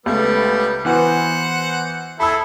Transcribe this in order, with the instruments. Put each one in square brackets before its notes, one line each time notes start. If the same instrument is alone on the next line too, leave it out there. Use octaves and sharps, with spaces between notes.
[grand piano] C#2 A3 [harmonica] G3 B3
[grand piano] E3 B3 F#4 [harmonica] C5 F#5
[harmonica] E4 G#4 A4 [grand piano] B5 E6